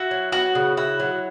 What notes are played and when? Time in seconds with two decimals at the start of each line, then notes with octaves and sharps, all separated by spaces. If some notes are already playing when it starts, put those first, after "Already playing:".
Already playing: E4 F#4
0.11 F#3
0.32 B3 F#4
0.55 C#3
0.77 E4 F#4
1.00 F#3